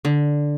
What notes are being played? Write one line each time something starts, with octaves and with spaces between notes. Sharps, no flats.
D3